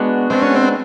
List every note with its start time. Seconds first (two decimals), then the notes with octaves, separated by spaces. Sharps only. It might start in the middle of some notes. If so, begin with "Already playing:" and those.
Already playing: G#3 B3 D4 F#4
0.30 G#3 B3 C4 D4 F#4
0.42 C#4
0.55 C4